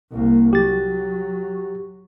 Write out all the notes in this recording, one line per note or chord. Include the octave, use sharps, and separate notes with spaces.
C2 A#3
F#3 G4 A6